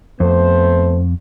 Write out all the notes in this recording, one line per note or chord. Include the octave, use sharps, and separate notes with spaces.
F2 A3 B3 C5